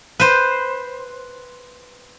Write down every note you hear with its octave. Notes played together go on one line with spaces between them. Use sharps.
B4 C5